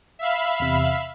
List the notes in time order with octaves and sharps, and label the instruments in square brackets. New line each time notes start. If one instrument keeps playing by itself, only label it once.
[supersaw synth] E5 F5 B5
[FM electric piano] E2 C3